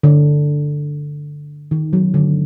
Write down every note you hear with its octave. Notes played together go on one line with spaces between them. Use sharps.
D3
D#3
F#3
D3